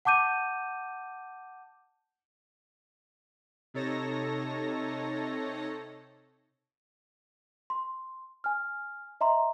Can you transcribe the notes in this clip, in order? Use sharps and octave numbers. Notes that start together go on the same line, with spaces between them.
F#5 A5 D6 G6 D#7
C3 D#4 A4 C#5 A5 A#6
C6
G#5 F6
D#5 E5 A#5 C6